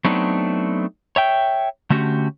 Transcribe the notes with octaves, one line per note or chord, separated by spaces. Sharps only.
F#3 A3 B3 C4 D4 D#4
C#5 E5 G5
D3 A3 C#4 F#4 G4